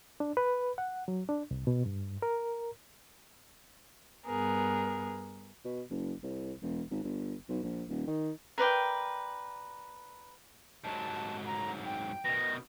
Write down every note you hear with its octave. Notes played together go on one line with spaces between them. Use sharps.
D4
B4
F#5
F#3
D4
C2
B2
G2
A#4
G2 B3 G#4 A#4
B2
F#1
C2
E1
G#1
G1
B1
A#1
D#1
D#3
A#4 B4 D5 G5
G#2 F#3 A5
A#5
G5
B2 D#3 A#6